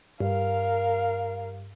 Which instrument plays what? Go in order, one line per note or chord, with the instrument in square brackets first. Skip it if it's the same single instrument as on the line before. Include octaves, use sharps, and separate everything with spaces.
[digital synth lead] G2 [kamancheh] A#4 F5